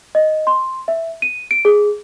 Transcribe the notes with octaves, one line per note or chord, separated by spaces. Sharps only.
D#5
C6
E5
D#7
D7
G#4